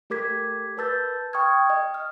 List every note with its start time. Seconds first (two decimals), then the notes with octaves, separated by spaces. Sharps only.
0.10 A3 G4 A#4 D6 G#6 B6
0.77 A#4 B4 A5 E6 G6 A6
1.33 G5 C#6 D#6 F6 G#6
1.70 D#5
1.94 F6